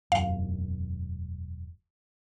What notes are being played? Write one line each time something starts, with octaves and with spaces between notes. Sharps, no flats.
E1 F#2 F5